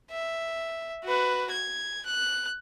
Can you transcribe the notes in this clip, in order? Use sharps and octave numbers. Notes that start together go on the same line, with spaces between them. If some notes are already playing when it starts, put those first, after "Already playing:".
E5
F#4 B4
G#6
F#6